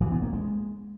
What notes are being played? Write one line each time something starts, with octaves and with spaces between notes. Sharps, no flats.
E3
B3
A#3
G#3